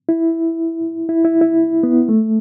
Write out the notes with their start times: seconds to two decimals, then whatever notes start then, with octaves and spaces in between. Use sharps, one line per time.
0.09 E4
1.09 E4
1.25 E4
1.41 E4
1.83 B3
2.09 A3